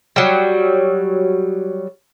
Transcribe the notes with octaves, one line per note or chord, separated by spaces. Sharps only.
F#3 G3